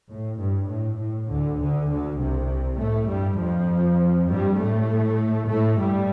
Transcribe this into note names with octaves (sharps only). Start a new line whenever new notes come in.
A2
G2
A2
A2
D2 D3
D2 D3
D2 D3
C2 C3
A2 A3
G2 G3
F2 F3
G2 G3
A2 A3
A2 A3
G2 G3